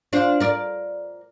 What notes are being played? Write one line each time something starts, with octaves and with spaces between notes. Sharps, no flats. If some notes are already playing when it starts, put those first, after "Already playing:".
D4 F4 C5
A#4 D5